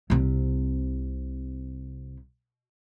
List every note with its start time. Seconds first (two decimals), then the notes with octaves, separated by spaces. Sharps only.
0.10 C2 C3